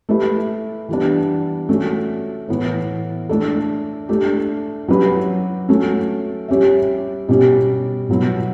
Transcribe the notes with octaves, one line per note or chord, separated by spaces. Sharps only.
A3 E4 G4 B4 E5
E3 G3 B3 D4
A3 C#4 F#4
A2 E3 B3
A3 D4 A4
A3 D4 G4
F#3 C#4 E4 G4 B4
A3 C#4 F#4
G3 C#4 G4 C#5 E5
B2 G3 C#4 G4
B2 F#3 B3 E4